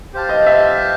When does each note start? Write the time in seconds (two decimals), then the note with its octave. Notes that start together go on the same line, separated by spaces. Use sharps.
0.13 G4 C5 F5 A5
0.29 D#5
0.46 E5